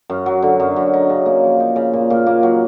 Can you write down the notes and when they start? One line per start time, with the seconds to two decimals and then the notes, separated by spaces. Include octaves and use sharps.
0.10 F#2
0.26 F#3
0.42 D3
0.60 F#2
0.76 F#2
0.93 D#4
1.10 C#3
1.26 A#3
1.44 F3
1.60 D#4
1.76 C#3
1.93 A#2
2.10 A#2
2.26 A#3
2.43 F#3